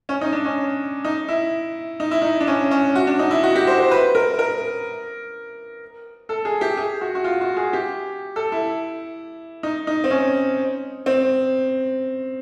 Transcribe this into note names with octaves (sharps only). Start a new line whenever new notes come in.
C#4
D#4
D4
C#4
D#4
E4
D#4
E4
D#4
D4
C#4
C#4
F#4
D4
D#4
E4
F#4
G4
C5
C5
B4
A#4
A#4
A4
G#4
G4
G#4
F#4
F#4
F4
F#4
G#4
G4
A4
E4
D#4
D#4
C4
C#4
C4